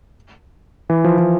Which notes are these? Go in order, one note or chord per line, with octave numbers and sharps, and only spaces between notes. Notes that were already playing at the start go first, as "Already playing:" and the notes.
E3
F3
E3